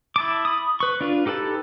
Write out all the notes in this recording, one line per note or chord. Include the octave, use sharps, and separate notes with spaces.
E4 A5 D6
B5 D#6
B4 C#6
D4 F4 B4
D#4 G4 A4 B4 A5